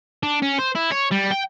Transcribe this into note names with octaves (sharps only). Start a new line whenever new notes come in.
D4
C#4
C5
E4
C#5
G3
G5